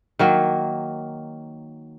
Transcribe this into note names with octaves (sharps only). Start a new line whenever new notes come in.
D#3 F#3 A#3